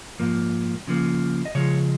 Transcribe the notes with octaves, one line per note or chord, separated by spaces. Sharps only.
G#2 F3 A#3
C#3 F3 A#3
D#5
C#3 F3 G#3 C#5